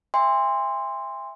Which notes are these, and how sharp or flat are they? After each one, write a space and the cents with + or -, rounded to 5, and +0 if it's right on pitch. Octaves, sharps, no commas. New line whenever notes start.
E5 +0 G#5 -45 C6 +0